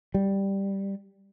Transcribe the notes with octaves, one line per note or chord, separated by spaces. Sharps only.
G3